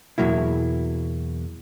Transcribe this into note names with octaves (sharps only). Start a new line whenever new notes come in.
E2 G#2 B2 F#3 A#3 E4